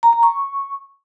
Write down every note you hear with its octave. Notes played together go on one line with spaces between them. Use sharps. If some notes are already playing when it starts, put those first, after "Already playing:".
A#5
A#5
C#6